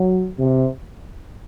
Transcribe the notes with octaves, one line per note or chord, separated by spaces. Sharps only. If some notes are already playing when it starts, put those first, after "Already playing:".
Already playing: F#3
C3